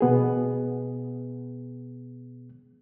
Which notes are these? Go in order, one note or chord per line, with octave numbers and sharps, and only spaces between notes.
B2 B3 G#4